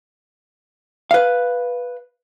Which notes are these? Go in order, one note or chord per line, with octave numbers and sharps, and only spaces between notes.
B4 F5